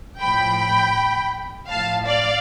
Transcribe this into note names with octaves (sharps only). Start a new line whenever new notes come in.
A2 F3 G5 B5
A2 F3 F5 A5
D5 F5